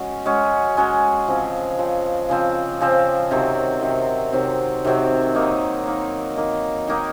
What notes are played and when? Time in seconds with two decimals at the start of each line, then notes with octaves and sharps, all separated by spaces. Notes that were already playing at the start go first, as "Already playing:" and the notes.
Already playing: G#3 C#4 F#4
0.26 G#3 C#4 F#4
0.77 G#3 C#4 F#4
1.28 C#3 F3 C4
1.78 C#3 F3 C4
2.29 C#3 F3 C4
2.81 C#3 F3 C4
3.31 C3 D#3 F#3 C4
3.82 C3 D#3 F#3 C4
4.32 C3 D#3 F#3 C4
4.84 C3 D#3 F#3 C4
5.34 D#3 A#3 D#4
5.85 D#3 A#3 D#4
6.36 D#3 A#3 D#4
6.88 D#3 A#3 D#4